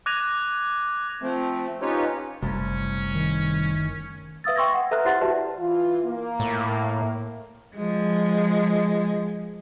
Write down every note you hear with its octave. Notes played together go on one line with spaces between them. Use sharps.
D6 F#6 G#6 A#6 D#7 F7
F3 A3 C4
C#4 D#4 F4 G4 B4 C#5
F#1 C2 A3 C#4
D#3
B4 E5 F5 D#6 E6 A6
G5 C6 C#6 E6 G#6 A#6
F#5
A4 B4 E5 A#5 F6 F#6
E4 G4 C5 F#5 C6 A6
F#4 G4 B4 D5 E5 A5
E3 F4
A#3
A2
F3 G#3